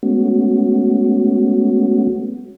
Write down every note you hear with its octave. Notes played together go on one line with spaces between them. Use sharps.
G#3 A3 B3 C#4 F#4